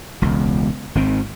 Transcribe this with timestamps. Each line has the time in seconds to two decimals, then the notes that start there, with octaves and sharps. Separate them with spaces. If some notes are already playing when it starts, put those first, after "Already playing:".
0.22 E1 C#2
0.95 G#1 D#3 C4